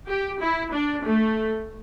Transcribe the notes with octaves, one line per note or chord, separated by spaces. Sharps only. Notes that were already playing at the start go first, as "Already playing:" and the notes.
G4
E4
D4
A3